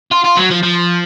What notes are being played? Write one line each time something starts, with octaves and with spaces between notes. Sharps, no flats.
F4
F4
F#3
F3
F3